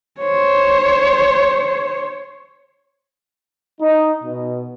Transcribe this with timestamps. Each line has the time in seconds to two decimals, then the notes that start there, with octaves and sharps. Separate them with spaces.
0.21 C5 C#5
3.80 D#4
4.23 B2